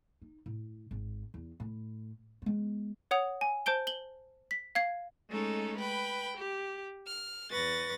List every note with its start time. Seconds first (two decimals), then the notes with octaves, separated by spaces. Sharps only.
0.22 D#4
0.46 A2
0.91 G#1
1.34 E2
1.60 A2
2.42 G#3 B3
3.11 C#5 F#5 D#6 F7
3.41 G#5
3.66 C5 A5 G6 D7 G7
3.87 F#7 G7
4.51 B6
4.75 F5 G#6 C7
5.29 G#3 A3 C#4 D#4 A4
5.78 B4 G5 B5
6.37 G4
7.07 F6
7.51 E2 B4 C#6 A6 A#6